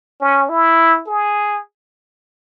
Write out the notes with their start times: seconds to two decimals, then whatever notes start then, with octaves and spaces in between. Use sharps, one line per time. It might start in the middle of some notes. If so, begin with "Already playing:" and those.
0.20 C#4
0.49 E4
1.07 G#4